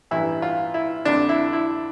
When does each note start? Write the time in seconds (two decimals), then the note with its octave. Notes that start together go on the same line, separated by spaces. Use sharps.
0.11 A1 G2 E3 E4
0.42 F4
0.74 E4
1.05 F2 D3 D4
1.29 E4
1.53 E4